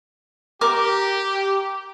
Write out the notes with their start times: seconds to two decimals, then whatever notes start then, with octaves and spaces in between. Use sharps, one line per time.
0.61 G4 A#4 D6